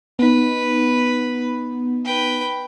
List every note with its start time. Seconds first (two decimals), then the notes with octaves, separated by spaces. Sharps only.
0.19 B3 D#4 B4
2.05 B4 G5